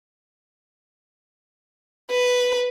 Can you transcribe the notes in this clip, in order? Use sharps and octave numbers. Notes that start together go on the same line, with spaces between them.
B4